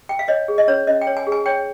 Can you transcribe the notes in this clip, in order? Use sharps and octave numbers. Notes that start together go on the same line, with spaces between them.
G5
F5
C#5 D#5
G#4
D#5
C#4 C#5
C#4 D#5
G5
C#5
G#5
G#4
G#5
C#5 G5